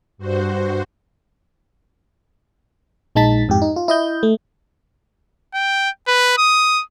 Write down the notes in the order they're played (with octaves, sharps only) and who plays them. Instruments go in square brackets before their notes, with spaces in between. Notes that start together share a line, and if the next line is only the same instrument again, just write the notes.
[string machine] G2 F#4 C5
[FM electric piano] A#1 G#3 D#4 A5 A6 B6
F2 G#2 G4
D#4
F4
E4 D#5 G6
A3
[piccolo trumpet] G5
B4
D#6